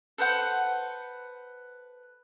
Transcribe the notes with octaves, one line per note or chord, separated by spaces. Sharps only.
A4 B4 C5 F#5